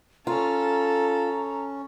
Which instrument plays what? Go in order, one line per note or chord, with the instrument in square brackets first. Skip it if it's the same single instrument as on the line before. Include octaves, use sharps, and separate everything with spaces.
[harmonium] C#4 [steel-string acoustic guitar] F4 [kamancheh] A4 [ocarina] A#5